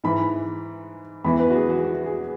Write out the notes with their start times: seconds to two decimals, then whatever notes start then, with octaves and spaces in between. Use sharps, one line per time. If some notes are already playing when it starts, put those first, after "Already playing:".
0.04 G#2 E3 B5
1.24 E2 E3 B5
1.40 B4
1.50 F#4
1.55 G#4
1.69 F#4
1.85 F#4
2.05 G#4